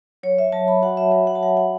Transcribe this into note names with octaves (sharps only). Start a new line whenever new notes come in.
F#3 C#5
E5
F#3 A5
B5
F#4 F#5
E5
F#3 E5
F#5
A5
F#3 F#5
F#5